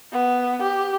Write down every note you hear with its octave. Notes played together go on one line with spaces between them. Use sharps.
B3
G4